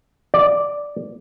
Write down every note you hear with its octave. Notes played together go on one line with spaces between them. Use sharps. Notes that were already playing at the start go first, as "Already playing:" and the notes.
D5